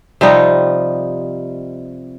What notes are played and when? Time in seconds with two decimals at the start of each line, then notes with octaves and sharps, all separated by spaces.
0.21 C3 F3 G3 D#4